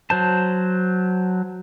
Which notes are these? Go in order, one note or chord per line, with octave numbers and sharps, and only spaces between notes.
F#3 C5 A5